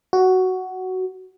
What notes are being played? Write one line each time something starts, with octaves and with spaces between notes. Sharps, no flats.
F#4